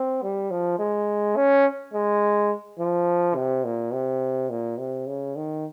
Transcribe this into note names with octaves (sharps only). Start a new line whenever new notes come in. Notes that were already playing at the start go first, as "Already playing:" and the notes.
Already playing: C4
G3
F3
G#3
C#4
G#3
F3
C3
A#2
C3
A#2
C3
C#3
D#3